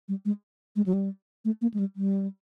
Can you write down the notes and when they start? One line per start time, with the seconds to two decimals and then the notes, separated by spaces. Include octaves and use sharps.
0.08 G3
0.25 G#3
0.76 G#3
0.86 F#3
0.93 G3
1.45 A3
1.62 A#3
1.74 G#3
1.79 G3
1.96 G3